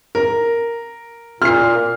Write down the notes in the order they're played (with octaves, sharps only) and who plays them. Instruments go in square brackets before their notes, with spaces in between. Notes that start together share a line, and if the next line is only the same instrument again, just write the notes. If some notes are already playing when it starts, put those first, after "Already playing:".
[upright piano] A#4
[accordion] A#2 [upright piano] F6 C7